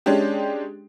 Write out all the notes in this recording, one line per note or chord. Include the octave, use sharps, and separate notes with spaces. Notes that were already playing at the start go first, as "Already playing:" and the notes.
G#3 C#4 D4 G4